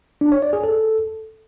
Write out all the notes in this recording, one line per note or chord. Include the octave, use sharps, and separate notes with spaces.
D4
C#5
D5
G#4
A4